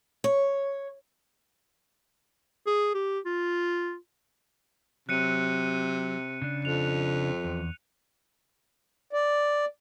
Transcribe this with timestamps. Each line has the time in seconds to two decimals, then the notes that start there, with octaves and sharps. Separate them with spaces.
0.24 C#5
2.67 G#4
2.95 G4
3.26 F4
5.09 C3 F#3 F#6 C#7 D#7
6.42 C#3 D4
6.65 F2 F7
7.44 E2
9.13 D5